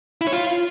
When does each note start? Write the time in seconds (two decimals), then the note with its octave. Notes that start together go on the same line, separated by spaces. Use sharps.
0.21 E4
0.27 C#5
0.32 F4